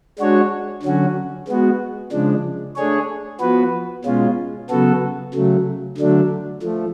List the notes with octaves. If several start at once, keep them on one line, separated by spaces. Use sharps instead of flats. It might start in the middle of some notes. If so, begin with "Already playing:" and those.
G#3 D4 F#4 C#5
D3 F#3 C#4 F#4
G#3 B3 F#4
C#3 F3 G#3 D4
A3 D4 G#4 C#5
F3 B3 F#4 B4
B2 G#3 C#4 F4
C#3 F#3 B3 F#4 A4
C#3 F#3 A3
D3 F#3 A3 D4
F3 A3